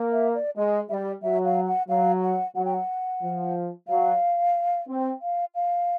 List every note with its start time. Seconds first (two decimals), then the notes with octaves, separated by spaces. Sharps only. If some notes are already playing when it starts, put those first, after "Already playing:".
Already playing: A#3
0.12 E5
0.35 D5
0.56 G#3 D#5
0.89 G3 D5 E5
1.22 F#3 E5
1.45 F5
1.67 F#5
1.89 F#3 F5
2.22 F#5
2.55 F#3 F#5
2.65 G5
2.74 F#5
3.22 F3
3.88 F#3 F5
4.88 C4
5.22 F5
5.55 F5